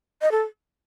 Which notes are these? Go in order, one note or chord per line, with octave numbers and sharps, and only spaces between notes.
D#5
A4